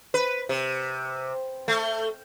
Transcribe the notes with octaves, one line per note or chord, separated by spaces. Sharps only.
B4
C3
A3